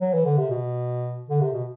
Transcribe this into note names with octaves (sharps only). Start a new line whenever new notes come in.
F#3
E3
D3
C3
B2
D3
C3
B2